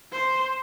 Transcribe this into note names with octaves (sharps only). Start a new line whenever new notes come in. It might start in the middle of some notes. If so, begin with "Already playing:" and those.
C5